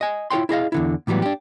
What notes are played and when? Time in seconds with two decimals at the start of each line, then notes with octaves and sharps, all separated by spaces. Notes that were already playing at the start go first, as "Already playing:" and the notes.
0.01 D#5 G#5
0.30 E4 F4 A4 C#5 G5 C6
0.49 E4 G#4 D#5 F5
0.72 E2 D3 E4
1.07 A2 E3 F#3 G3 B3
1.22 D4 G4